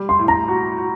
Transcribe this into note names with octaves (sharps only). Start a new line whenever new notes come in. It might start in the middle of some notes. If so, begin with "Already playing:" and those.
Already playing: G3
C6
A2
A#5
F#4
F#4